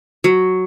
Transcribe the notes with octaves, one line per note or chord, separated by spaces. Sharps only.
F#3